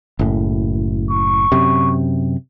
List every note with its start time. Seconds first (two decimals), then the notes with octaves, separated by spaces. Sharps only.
0.19 F#1 A2
1.10 C#6
1.52 F#2 C3